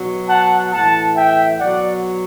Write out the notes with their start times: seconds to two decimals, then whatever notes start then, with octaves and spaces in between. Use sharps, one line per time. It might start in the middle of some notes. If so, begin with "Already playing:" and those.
Already playing: B2 F#3
0.29 F#5 A5
0.72 A2 E3 F#5 A5
1.16 E5 G5
1.60 B2 F#3 D5 F#5